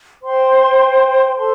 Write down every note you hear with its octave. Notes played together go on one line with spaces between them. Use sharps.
C5 G5 C6
A4 C5 A5 C6